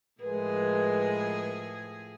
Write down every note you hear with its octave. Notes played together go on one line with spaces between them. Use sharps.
A2 F3 G#3 G#4 A#4 B4